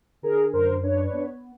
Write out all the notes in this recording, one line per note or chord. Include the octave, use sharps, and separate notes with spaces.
D3 G#4 A#4
F#2 A#4 C5
D4 B4 C#5
B3